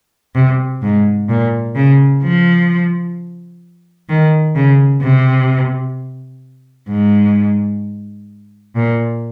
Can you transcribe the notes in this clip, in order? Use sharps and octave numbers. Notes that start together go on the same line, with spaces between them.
C3
G#2
A#2
C#3
F3
D#3
C#3
C3
G#2
A#2